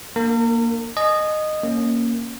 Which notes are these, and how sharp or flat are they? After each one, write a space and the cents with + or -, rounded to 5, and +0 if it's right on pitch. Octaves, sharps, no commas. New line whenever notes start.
A#3 +0 D4 +30 A#4 -40
D#5 -15 G#5 +30
A#3 +0 C#4 +0